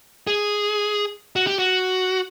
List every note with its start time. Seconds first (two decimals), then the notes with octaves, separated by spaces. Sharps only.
0.27 G#4
1.36 F#4
1.47 G4
1.59 F#4